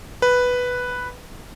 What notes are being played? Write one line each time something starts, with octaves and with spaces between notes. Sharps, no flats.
B4